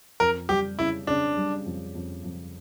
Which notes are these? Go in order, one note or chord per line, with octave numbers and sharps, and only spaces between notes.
F2 A#4
G3 G4
C#3 E4
C#3 D4
G3
F2
F2
F2